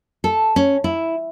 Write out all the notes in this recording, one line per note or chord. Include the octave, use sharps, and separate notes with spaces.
A4
C#4
E4